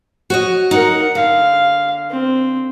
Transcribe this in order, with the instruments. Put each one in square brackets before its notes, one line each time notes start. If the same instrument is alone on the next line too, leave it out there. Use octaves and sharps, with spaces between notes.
[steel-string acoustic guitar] F#4 C#5 D#5
[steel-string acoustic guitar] D#4 [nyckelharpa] A#4 F#5
[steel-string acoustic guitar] D3 [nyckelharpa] F5
[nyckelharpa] C4